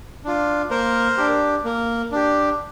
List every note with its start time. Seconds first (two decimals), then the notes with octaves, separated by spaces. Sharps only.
0.24 D4 F4
0.71 A#3 A#4 C5
1.17 D4 G4
1.65 A#3
2.12 D4 G4